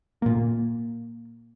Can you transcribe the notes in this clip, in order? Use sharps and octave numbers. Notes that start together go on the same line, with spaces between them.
A#2 A#3